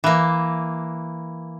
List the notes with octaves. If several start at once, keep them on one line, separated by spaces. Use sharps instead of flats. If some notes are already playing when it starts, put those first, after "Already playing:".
E3 A#3